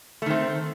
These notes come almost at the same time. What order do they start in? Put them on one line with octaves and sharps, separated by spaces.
A3 D#3 C4